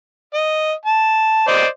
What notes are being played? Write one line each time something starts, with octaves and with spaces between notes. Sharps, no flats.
D#5
A5
C5 D5 D#5